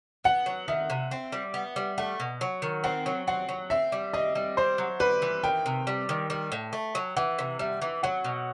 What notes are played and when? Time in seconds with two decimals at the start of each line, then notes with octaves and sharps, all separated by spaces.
0.24 B3 F#5
0.46 F#3
0.68 D#3 E5
0.90 C3
1.11 C4
1.32 G3
1.54 B3
1.76 G3
1.98 A3 F#5
2.20 B2
2.41 F#3
2.62 D#3
2.84 C4 F#5
3.06 F#3
3.28 C4 F#5
3.49 F#3
3.70 C4 E5
3.92 G3
4.13 C4 D#5
4.35 G3
4.57 C4 C5
4.78 F#3
5.00 G3 B4
5.22 E3
5.44 D#3 G5
5.66 C3
5.87 G3
6.09 D#3
6.30 G3
6.52 A2
6.73 A3
6.95 F#3
7.17 E3 F#5
7.39 C3
7.59 G3 E5
7.82 E3
8.03 F#3 F#5
8.24 B2